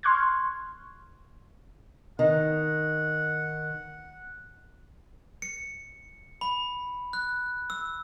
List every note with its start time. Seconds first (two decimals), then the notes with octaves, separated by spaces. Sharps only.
0.03 C6 C#6 F6 F#6 G#6
2.19 D#3 F#5
5.42 C#7
6.41 B5
7.13 F#6
7.70 E6